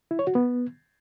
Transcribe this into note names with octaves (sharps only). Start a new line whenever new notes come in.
E4
C#5
F#4
B3